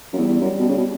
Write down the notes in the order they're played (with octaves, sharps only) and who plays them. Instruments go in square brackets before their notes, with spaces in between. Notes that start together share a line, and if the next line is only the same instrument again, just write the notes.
[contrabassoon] F#2
[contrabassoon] E2 [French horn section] G3
[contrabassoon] E2
F#2
B2
C#3
B2